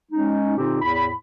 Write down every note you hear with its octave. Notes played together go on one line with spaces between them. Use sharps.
G#3 C#4 D#4
A#2 D3 C4 D#4 F4 G4
E2 A2 B5